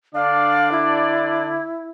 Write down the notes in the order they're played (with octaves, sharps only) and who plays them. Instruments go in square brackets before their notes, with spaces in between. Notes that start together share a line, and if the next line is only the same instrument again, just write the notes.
[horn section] D3 D4 D5 [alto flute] F5
[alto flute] E4